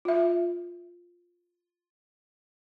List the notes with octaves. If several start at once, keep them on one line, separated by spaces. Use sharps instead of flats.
F4 E5